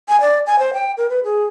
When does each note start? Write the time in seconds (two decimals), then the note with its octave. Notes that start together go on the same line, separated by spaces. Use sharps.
0.09 G#5
0.21 D5
0.47 G#5
0.59 C5
0.74 G5
0.97 A#4
1.10 B4
1.24 G#4